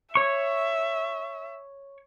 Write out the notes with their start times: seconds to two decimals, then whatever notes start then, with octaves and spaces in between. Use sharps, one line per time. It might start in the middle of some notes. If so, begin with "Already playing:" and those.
0.15 C#5 E5 C#6